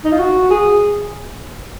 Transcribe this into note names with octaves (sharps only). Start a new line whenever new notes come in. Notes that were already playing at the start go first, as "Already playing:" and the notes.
D#4
F4
F#4
G#4